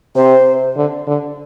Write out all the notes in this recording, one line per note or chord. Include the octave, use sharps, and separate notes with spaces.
C3 C5
D3
D3